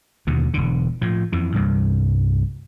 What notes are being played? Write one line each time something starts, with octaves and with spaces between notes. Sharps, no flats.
D#2 B2 D3
E1 D3
A2 F3
F2 E3
C2 G2 A#2